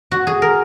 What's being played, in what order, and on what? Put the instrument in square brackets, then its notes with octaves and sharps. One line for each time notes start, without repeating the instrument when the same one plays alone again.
[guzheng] F#4
G#4
A#4